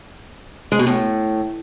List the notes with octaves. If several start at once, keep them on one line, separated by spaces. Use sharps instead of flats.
G#3
B2
A2